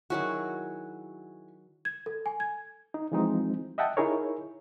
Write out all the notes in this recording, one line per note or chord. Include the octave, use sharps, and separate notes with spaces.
D#3 F#3 E4 F#4 G#4
G#6
A4
G#5
G#6
D#4
E3 F3 G#3 C4 D#4
D#5 E5 F#5 G5 A5
D#4 E4 G#4 A#4 C#5